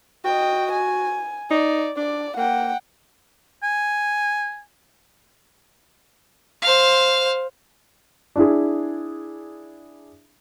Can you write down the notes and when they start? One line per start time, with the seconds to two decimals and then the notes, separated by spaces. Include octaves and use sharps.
0.25 F#4 D#5 G5
0.72 G#5
1.51 D#4 D5
1.97 D4 D5
2.37 A#3 F#5 G5
3.63 G#5
6.62 C5 F5
8.36 D4 E4 G#4